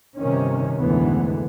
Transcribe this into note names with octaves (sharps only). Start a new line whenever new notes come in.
G1 C3 D#3 C#4
F1 D2 G#2 D3 E3 B3